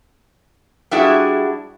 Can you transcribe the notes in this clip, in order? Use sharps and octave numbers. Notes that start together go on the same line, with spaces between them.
G3 D4 E4 F#4 G#4